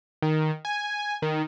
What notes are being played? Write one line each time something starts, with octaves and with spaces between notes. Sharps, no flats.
D#3
G#5
D#3